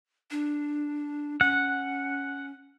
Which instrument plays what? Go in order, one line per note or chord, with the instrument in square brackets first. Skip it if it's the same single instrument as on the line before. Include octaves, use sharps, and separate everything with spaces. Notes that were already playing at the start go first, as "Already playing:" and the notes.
[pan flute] D4
[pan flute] C#4 [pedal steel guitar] F#5